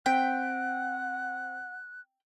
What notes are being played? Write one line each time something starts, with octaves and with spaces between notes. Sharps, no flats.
C4 F#5 G5 F#6 B6